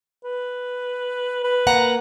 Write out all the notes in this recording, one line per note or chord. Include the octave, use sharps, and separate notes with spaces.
B4
B4
A#3 F#5 A#5